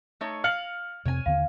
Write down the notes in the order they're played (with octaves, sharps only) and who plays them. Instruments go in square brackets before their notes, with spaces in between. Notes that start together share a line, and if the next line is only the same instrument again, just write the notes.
[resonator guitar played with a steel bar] A3 D#4 C#5
[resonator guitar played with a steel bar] F5 [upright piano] F6 C#7 F#7
[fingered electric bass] F2 C3 C4 [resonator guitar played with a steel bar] C#5 G#5
[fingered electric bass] D#2 D3 B3 [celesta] F5